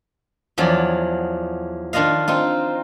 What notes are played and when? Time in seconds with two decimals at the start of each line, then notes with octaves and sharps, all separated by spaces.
0.58 E2 F3 F#3 D5
1.93 D#3 D4 F4 D#5 F5
2.28 C4 D#4 F4